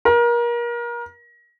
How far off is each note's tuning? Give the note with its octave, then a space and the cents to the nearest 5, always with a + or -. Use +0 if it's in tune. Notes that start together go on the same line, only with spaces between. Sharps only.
A#4 +30